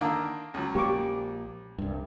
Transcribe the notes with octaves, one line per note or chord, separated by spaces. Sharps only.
D3 D#3 A#3
C#2 F#3
A#1 F3 A#3 G4 C#6 D6
C2 G2